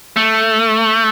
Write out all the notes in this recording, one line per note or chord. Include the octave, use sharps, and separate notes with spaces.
A3